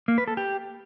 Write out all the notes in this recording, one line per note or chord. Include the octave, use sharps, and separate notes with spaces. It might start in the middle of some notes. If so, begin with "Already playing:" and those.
A#3
B4
A4
G4